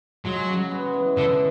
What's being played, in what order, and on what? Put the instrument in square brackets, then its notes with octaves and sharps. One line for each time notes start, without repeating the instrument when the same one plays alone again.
[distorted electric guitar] F#3 [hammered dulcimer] G#3
[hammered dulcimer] C#3
B3
E3
[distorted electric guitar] D3 [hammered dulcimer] E3